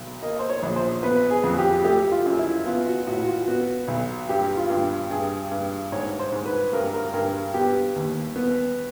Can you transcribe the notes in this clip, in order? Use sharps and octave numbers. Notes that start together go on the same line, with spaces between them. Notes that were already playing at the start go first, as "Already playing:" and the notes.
Already playing: B1
A#3 D#5
C5
C#5
A#1
C5
B3 B4
G#4
F2
G4
A3 G4
F4
F#2
E4
B3 F4
F#4
A2 F#4
F#4
F4
B3 F#4
B1
G2 G4
F4
G2
G2 G#4
G2
G#2 C#5
C5
G#2
B4
G2 A#4
A#4
G2 A#4
B3 G4
D#2
B3